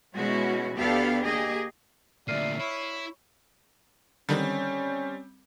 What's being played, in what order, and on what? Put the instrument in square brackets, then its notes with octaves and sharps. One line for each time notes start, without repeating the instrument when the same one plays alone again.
[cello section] B2 G#3 C#4 E4 F#4
D2 B3 D4 G4 A4 F5
A#3 G4 G#4 D#5
[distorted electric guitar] D2 A#2 [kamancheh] D5 E5 [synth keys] F6 C7 D#7
[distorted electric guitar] E4 [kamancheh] C#5
[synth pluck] D3 D#3 [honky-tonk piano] G3 C4 [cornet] C#4